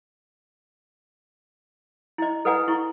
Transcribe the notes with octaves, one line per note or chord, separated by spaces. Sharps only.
E4 D#5
A4 B4 D#5 F#5 G#5 A#5
E4 C#6